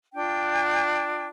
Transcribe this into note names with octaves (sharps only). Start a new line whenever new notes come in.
D4 F4 G5